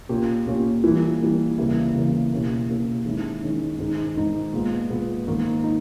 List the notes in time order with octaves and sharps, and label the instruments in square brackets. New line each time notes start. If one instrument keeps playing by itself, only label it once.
[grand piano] A#2 A#3 C#4 G4
A#2 A#3 C#4 G4
E3 G3 A#3
E3 G3 A#3
E2 C#3 G3 A#3 E4
E2 C#3 G3 A#3 E4
B2 A#3 C#4 E4 G4
B2 A#3 C#4 E4 G4
D#3 G#3 C#4 E4
D#3 G#3 C#4 E4
G#2 D#3 G#3 D#4
G#2 D#3 G#3 D#4
A#2 G#3 B3
A#2 G#3 B3
G#2 D#3 A#3 D#4
D#4